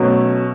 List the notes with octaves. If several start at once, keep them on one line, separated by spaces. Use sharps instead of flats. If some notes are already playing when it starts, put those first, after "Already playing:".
Already playing: B2 F#3 A3 C#4